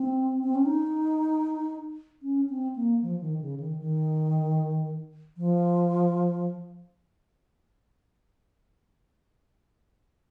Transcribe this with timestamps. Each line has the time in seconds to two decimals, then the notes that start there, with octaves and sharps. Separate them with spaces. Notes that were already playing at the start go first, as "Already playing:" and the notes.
Already playing: C4
0.43 C4
0.55 C#4
0.66 D#4
2.23 C#4
2.50 C4
2.76 A#3
3.02 F3
3.21 D#3
3.41 C#3
3.60 D#3
3.80 D#3
5.37 F3